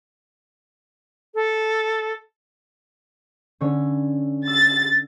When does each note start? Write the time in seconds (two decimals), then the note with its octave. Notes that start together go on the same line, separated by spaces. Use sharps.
1.35 A4
3.61 D3 C#4 C#5
4.47 E6 A6